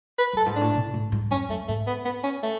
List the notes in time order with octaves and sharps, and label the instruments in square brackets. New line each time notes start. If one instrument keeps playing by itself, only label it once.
[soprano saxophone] B4
[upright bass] F#2 [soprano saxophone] A4
[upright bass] G#2
[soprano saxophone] D4
[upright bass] A2
B2
A2
G#2
[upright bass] F#2 [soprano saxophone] C#4
[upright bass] F#2 [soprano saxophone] A3
[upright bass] G#2 [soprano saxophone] A3
[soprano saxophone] B3
B3
C#4
A3